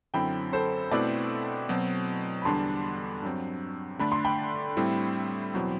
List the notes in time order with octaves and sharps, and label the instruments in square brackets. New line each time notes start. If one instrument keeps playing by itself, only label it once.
[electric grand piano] F#2 D3 F#3 C4 E4 [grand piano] G5 B5
[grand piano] A4 C5
[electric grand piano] B2 A3 C4 E4 [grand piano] B4 D5
[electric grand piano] B2 F#3 C4
[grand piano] B5
[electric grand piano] E2 D3 G3 D4 [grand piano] A5 C6
[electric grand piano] G2 F#3 C4
[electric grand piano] D3 A3 D4 [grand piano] B5
[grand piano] C6
G5 B5
[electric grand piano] A2 G3 C4 E4
E2 B2 F#3 C4 E4